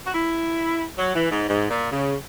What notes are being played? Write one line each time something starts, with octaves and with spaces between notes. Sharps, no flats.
F#4
E4
F#3
E3
G#2
G#2
A#2
C#3